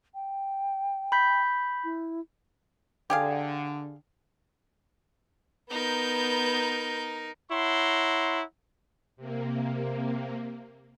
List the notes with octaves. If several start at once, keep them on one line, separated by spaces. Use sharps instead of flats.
G5
B5 G6 B6
E4
D3 G4 G#4 F5
B3 D#4 A#4 G6
E4 C#5 F#5 A#5 C6
C3 A#3